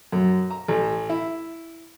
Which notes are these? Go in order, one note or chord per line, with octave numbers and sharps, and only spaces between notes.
F#2
A#5
A1
E4